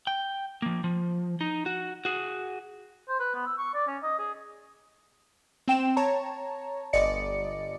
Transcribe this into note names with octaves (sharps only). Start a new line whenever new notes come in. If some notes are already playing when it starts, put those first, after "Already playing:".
G5
F3 A#3
F3
D#4
F#4
F#4 G#4
C5
B4
B3
E6
C#6
D5
C#4
D#5
G#4
C4 G5 E7
C#5 A5 A#5
G1 D5 D#5 C#7